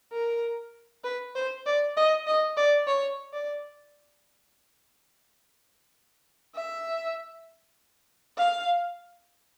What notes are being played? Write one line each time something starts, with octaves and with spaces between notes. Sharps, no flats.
A#4
B4
C5
D5
D#5
D#5
D5
C#5
D5
E5
F5